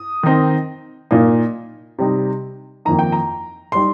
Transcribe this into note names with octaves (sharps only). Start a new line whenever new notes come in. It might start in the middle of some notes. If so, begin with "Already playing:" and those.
Already playing: D#6
D#3 C4 D#4
A#2 A#3 D#4
C3 G3 D#4
F2 D#3 A#3 D#4 A#5
G5
A#5
G3 D#4 C6